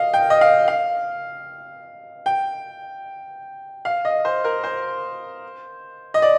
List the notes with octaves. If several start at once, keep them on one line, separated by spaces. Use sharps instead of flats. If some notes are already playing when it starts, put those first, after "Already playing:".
Already playing: D#5 F5
G5
D#5
F5
F5
G5
F5
D#5
C5
A#4
C5
D#5
D5